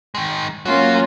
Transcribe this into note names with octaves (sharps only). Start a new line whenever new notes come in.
D#3 G#3
F#3 A#3 C#4 F4